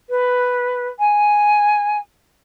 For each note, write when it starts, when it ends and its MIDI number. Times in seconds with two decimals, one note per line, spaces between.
0.09 0.88 71
0.98 1.97 80